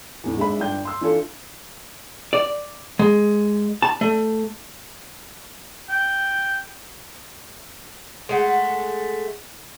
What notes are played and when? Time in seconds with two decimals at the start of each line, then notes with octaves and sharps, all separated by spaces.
0.24 E2 A2 D3
0.37 G#1 G#3 D4 E5 B5
0.59 G1 D4 G5 G6
0.85 C6 E6
1.01 E3 D4 E4 F4 A4
2.33 D5
2.99 G#3
3.82 A5
4.01 A3
5.90 G5
8.29 G#3 A3 F#5